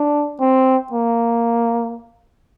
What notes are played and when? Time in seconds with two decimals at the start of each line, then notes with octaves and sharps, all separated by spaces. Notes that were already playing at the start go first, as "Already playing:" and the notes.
Already playing: D4
0.41 C4
0.93 A#3